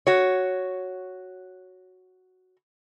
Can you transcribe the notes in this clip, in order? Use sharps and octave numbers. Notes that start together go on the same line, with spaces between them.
F#4 C#5